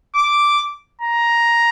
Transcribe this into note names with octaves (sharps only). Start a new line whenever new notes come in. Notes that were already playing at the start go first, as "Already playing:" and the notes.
D6
A#5